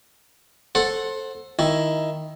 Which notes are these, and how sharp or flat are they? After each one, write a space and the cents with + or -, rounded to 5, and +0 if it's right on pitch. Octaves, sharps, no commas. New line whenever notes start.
A4 +0 C5 +20 F#5 +0
D#3 +5 E4 +5